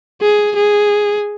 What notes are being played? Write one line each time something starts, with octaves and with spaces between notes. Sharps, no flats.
G#4
G#4